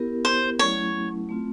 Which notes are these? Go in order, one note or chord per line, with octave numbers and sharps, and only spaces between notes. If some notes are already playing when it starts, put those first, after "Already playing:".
Already playing: B3 E4 G4 A#4
C5
F#3 A3 C#4 E4 C#5
A3 C4 F4